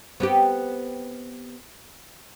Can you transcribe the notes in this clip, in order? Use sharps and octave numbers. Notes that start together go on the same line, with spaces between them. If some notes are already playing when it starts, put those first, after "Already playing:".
B3 C4 G4